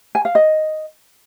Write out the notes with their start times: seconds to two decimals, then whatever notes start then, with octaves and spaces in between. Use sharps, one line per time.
0.15 G#5
0.25 F5
0.35 D#5